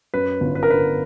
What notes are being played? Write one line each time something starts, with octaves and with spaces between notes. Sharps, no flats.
F#2 B4
G1
B4
A#4
D3 B4